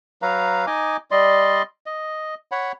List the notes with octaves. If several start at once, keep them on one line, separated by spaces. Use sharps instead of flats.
F#3 B4 F5 A#5
D#4 D#5 G#5 D6
G3 D5 D#5 C6
D#5
C#5 F#5 B5